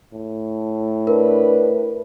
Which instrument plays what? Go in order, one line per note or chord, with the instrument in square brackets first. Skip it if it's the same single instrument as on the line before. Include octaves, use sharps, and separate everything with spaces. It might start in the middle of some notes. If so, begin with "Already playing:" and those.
[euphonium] A2
[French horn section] D4 B4 [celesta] A#4